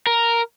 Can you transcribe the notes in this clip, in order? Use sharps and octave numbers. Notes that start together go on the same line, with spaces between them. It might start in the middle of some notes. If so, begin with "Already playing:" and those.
A#4